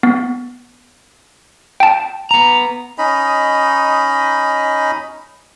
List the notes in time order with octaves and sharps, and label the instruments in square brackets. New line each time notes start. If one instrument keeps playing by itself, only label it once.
[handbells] B3
G5 A5
[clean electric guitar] B3 A#5
[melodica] C#4 D#4 D#5 B5